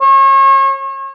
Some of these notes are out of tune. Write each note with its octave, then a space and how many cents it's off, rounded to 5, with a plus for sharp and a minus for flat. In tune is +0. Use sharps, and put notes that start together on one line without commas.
C#5 -35